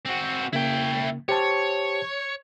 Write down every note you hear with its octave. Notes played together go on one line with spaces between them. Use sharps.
C4 F#4
C#3 A#3 E4 G5
G4 C5 C#5 A5